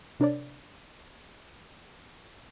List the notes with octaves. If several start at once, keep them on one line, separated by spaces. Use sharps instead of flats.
C3 D4 A#4 C#5 D5